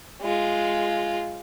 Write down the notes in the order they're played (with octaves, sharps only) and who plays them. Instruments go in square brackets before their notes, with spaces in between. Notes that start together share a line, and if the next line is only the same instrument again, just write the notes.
[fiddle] G#3 F4